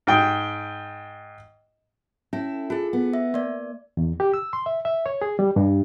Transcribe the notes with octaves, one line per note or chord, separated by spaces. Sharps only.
G#2 G5
C#4 E4 A4
F4 G#4 A4
B3
E5
A#3 D5
E2
G4
E6
C6
E5
E5
C#5
G#4
G3
G2